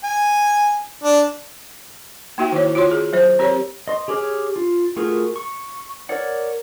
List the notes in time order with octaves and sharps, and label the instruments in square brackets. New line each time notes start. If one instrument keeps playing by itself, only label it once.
[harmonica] G#5
D4
[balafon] A#3 D#4 F#4 E5 G5
D#3 E4 C#5
F4 F#4 C#5 C6
G#4
F#3 C5
C4 G4 A#4 C#5
[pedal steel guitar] D#5 C6
G4 G#4 C#5 D6 F6
F4
A3 F4 F#4 G#4 A#4
C#6
A#4 C#5 D5 F#5